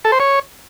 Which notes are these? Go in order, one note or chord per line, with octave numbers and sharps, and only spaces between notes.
A4
C5
C#5